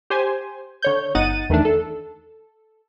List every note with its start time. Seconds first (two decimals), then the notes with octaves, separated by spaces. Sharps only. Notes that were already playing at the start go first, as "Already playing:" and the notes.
0.10 G4 C5 G#5
0.82 D3 C#5 G6
1.15 G1 D#4 F#5 A6 D#7
1.49 E2 D#3 A3 D4
1.65 A4